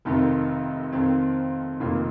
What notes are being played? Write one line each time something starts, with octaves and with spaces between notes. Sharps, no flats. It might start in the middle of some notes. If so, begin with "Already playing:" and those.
F1 F2 C3 D#3
F2 D#3 C4
F1 F2 D#3 A#3 F4